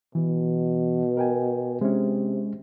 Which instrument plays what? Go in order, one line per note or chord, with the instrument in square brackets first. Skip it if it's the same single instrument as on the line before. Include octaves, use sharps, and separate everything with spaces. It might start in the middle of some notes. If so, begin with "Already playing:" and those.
[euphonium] B2 [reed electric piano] E3
[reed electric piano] A#4 G5 G#5
[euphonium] C3 [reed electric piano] G#3 C#4